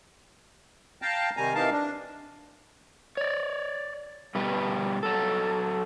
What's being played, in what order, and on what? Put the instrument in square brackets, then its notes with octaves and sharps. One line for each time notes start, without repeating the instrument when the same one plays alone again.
[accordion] F5 G5 A5 A#5
C3 D#3 G3 G#5 A#5
C3 E3 D#4 A#4 F5 A5
D4
[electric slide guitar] C#5 D5
B2 G3 B4
F#3 A4